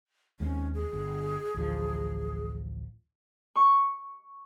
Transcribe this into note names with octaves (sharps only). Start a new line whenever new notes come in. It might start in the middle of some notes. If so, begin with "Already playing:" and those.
D#2 G#3 C4 C#4
G#4
G1
A1 D2 F3
C#6